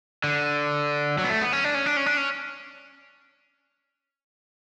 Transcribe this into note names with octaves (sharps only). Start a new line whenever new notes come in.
D3
F#3
B3
A3
B3
C#4
D4
C#4
D4
C#4
D4
C#4